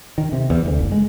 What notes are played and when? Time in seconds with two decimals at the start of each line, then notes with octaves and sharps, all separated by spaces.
0.18 D#3
0.32 C3
0.50 E2
0.66 D2
0.79 F#1
0.92 G#3